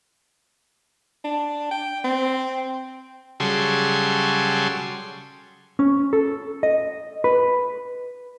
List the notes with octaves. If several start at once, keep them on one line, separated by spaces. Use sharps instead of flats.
D4
G5
C4
C#3 F#3 G3 G#4 A4 C6
C#4
A4
D#5
B4